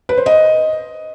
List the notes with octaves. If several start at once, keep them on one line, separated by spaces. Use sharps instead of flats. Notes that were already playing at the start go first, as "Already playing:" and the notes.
B4
C5
D#5